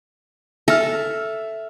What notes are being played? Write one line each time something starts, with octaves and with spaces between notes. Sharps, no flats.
A4 E5 F6